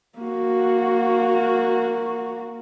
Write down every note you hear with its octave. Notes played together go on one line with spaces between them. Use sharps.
A#3 F#4